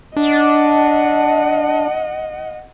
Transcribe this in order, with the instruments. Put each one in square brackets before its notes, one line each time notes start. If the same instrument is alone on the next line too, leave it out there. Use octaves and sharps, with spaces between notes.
[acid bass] D4 [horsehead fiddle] D#5 F#5